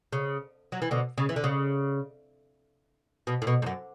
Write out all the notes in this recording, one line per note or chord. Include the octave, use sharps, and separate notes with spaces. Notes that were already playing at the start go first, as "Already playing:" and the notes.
C#3
F#3
E3
B2 D3
C#3
E3
D3
C#3
B2
A2
B2
G#2
F#2